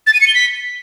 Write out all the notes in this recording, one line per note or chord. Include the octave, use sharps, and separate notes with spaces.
A6
D#7
C#7
G7
B6